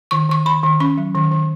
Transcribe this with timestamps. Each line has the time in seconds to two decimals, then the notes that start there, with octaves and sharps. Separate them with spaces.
0.11 D#3 C#6
0.29 D#3 C#6
0.46 D#3 B5
0.63 D#3
0.80 C#4 C#6
0.97 F#3
1.15 D#3
1.31 D#3